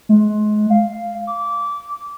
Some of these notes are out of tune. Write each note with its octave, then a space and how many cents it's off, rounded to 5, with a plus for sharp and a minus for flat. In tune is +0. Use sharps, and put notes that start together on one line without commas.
G#3 +30
F5 -5
D6 -20